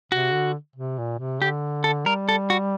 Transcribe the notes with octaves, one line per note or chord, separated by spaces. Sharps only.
C3 F#4
D3
C3
A#2
C3
D3 G4
A4
G3 A#4
A4
F#4